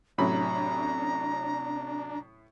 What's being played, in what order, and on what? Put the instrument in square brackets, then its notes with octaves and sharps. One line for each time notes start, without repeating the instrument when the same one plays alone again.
[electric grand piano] A2 B5 [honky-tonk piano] C3 F#3 C#4 [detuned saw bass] D4 [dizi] A#5